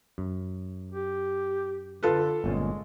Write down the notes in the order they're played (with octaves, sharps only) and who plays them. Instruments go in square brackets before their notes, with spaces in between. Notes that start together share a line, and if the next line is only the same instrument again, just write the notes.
[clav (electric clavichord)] F#2
[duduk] G4
[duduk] D3 [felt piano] F4 A4 B4
[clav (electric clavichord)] G1 A#2 C#4 [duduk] G#3